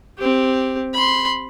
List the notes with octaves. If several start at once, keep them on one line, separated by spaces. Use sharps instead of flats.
C4 G4
B5 C6